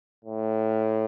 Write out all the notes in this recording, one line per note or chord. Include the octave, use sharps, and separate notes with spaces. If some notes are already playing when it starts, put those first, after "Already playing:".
A2